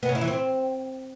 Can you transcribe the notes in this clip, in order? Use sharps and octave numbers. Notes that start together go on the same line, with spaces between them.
B3
C#3
E4
E3
C4